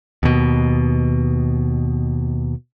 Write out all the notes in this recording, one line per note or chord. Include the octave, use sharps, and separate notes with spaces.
D#2 B2